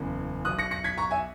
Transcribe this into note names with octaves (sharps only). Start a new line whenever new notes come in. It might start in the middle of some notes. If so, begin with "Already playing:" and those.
Already playing: F#1 E2 C#3
B1 B2 D#6 F#6
A#6 C#7
A#6 C#7
G#6 B6
A#5 C#6
E5 G#5